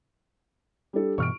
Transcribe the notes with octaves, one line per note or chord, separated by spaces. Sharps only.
G3 D4 A4
G2 B2 E3 C#6 F6 D7